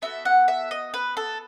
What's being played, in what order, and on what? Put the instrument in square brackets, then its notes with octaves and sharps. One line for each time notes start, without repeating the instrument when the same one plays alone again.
[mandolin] B3 F#4 A4 E5
F#5
E5
D#5
B4
A4